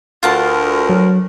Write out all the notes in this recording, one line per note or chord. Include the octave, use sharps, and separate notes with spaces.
D2 F4 A#4 F#5 A5
F#3